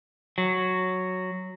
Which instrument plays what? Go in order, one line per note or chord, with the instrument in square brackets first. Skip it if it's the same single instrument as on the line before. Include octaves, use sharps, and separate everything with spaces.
[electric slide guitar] F#3